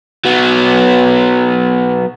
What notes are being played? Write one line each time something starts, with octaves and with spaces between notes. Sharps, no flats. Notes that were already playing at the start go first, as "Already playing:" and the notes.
F#3 B3